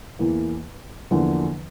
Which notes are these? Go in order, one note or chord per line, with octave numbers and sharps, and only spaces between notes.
E2 E3 A#3
E2 D3 F3 A#3